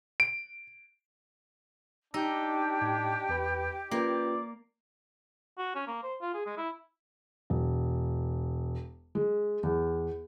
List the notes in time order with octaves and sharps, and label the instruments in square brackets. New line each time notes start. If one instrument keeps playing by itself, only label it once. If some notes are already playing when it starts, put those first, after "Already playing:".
[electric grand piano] D7
[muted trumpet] D4 [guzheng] D#4 [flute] G4 [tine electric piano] E6 A#6
[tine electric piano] A2 G#6
E2 B4 B5
[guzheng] A#3 [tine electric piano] C#4 F4 B4 [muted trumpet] D5
[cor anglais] F#4
C#4
A#3
C5
F4
G#4
G#3
E4
[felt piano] E1
G#3
E2